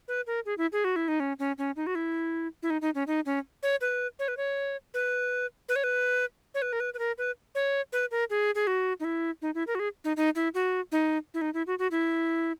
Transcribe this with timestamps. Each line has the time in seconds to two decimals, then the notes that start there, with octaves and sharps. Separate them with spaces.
0.08 B4
0.27 A#4
0.46 G#4
0.58 E4
0.72 G#4
0.84 F#4
0.96 E4
1.08 D#4
1.20 C#4
1.39 C#4
1.58 C#4
1.76 D#4
1.87 F#4
1.95 E4
2.63 E4
2.70 D#4
2.81 D#4
2.95 C#4
3.07 D#4
3.26 C#4
3.63 C#5
3.81 B4
4.19 C#5
4.28 B4
4.37 C#5
4.94 B4
5.69 B4
5.76 C#5
5.84 B4
6.54 C#5
6.62 B4
6.73 A#4
6.80 B4
6.94 B4
6.99 A#4
7.18 B4
7.55 C#5
7.92 B4
8.11 A#4
8.30 G#4
8.55 G#4
8.67 F#4
9.00 D#4
9.04 E4
9.42 D#4
9.55 E4
9.67 A#4
9.75 F#4
9.79 G#4
10.04 D#4
10.17 D#4
10.35 E4
10.54 F#4
10.92 D#4
11.34 E4
11.41 D#4
11.54 E4
11.67 F#4
11.79 F#4
11.91 E4